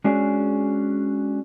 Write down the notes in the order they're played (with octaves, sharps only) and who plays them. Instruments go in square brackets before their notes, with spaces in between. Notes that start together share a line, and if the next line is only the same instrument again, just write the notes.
[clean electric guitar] G#3 C#4 D4 F#4 G#4